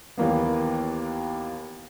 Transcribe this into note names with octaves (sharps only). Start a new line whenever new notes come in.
D#2 E3 A#3 B3